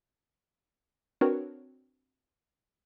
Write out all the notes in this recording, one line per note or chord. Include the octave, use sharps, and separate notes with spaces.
C4 D4 F#4 A#4 B4 C#5